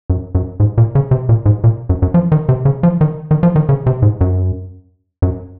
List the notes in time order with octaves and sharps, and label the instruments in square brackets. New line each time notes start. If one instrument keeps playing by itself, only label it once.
[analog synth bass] F#2
F#2
G#2
A#2
C#3
C3
A#2
G#2
A#2
F#2
F#2
F3
D#3
C3
C#3
F3
D#3
D#3
F3
D#3
C#3
C3
G#2
F#2
F#2